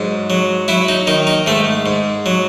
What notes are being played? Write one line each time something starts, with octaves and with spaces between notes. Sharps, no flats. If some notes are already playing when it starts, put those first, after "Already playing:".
Already playing: G#2 F#3
F#3
F#3 E4
D#4
D#3 D#4
D#4
G#2 A3
G#2
F#3